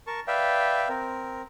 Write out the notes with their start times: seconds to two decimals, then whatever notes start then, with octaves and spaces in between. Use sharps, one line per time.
0.07 A#4 A5 C#6
0.28 B4 D5 E5 F5 G5
0.89 C4 A#4